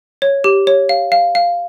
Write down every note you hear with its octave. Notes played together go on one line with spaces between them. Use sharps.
C#5
G4
C#5
F5
F5
F5